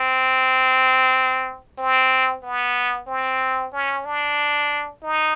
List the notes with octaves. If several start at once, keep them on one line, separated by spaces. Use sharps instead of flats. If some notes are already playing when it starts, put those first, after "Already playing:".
Already playing: C4
C4
B3
C4
C#4
D4
D#4